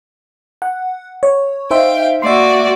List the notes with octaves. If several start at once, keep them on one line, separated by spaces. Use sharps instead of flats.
F#5
C#5
D#4 C5 E5 F5 G5
A#3 F#4 D5 E5 C6